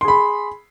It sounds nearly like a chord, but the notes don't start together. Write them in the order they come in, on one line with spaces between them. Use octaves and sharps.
C6 G#4 B5